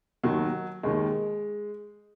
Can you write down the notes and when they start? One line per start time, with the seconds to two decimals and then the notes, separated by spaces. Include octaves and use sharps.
0.24 D#2 D#3 F#3
0.83 D#2 D#3 G#3